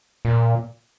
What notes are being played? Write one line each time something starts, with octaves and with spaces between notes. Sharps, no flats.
A#2